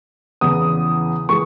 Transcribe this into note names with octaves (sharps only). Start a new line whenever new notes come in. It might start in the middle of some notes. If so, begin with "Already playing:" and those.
E2 C#3 E3 B3 D#6
E3 G#3 C#6